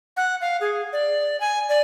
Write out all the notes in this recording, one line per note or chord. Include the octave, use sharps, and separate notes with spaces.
F#5
F5
G#4
D5
G#5
D5